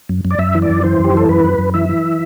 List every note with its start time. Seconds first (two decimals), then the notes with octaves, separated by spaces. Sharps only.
0.09 F#2
0.25 F#2
0.31 D5
0.39 F#2 E5
0.55 E3
0.62 D5
0.70 F#2
0.84 E3 C5
0.99 F#2 G4
1.14 E3 A4
1.29 F#2 B4
1.44 F#2
1.59 F#2
1.74 E3 E5
1.89 E3